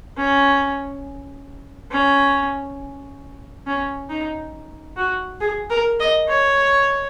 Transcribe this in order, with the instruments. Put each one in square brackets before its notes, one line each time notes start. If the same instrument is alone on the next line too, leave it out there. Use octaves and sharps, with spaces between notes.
[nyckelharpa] C#4
C#4
C#4
D#4
F#4
G#4
A#4
D#5
C#5